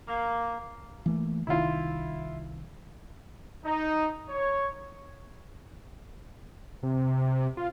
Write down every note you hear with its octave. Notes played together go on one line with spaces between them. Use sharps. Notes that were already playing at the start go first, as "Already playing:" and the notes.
A#3
E3 A3 A#3
C2 D#3 E4 F4
D#4
C#5
C3
F4